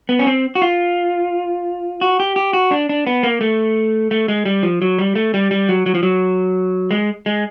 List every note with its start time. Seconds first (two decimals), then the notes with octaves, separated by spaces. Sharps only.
0.09 B3
0.19 C#4
0.27 C4
0.55 F#4
0.62 F4
2.01 F#4
2.20 G4
2.36 G4
2.53 F#4
2.71 D4
2.89 D4
3.07 B3
3.23 A#3
3.41 A3
4.11 A3
4.28 G#3
4.45 G3
4.63 F3
4.82 F#3
4.99 G3
5.15 A3
5.34 G3
5.51 G3
5.69 F#3
5.86 F#3
5.95 F3
6.03 F#3
6.91 G#3
7.26 G#3